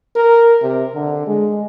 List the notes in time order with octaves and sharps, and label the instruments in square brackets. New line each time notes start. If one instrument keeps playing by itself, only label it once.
[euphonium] A#4
C3
D3
G#3